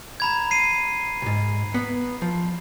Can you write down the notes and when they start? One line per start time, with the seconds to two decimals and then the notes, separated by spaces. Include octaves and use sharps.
0.20 A#5 B5 G#6
0.51 C7 D#7
1.22 C2 G#2
1.74 B3
2.22 F3